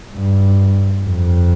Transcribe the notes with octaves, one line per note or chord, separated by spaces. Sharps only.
G2
F2